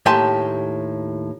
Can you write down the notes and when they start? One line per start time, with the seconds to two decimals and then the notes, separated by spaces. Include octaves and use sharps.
0.06 D#2 A2 G4 G#5 A5 C6